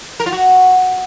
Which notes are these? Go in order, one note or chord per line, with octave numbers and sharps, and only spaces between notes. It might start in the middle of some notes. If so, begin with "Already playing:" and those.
A#4
F4
F#4